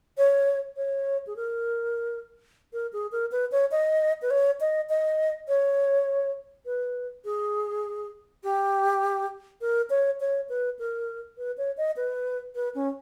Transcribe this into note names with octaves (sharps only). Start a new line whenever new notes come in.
C#5
C#5
G#4
A#4
A#4
G#4
A#4
B4
C#5
D#5
B4
C#5
D#5
D#5
C#5
B4
G#4
G4
A#4
C#5
C#5
B4
A#4
B4
C#5
D#5
B4
B4
C#4